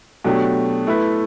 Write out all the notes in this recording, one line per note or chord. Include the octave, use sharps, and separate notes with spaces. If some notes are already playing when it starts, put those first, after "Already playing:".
B2 F#3 A3 D4 G4
A3 E4 B4